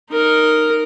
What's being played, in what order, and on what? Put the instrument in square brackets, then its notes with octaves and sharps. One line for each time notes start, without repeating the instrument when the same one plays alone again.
[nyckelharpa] D#4 A#4